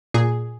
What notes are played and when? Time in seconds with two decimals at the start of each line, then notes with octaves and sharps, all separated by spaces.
0.14 A#2 G#4